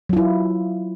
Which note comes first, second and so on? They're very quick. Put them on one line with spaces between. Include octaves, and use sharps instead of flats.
F#3 F4 E4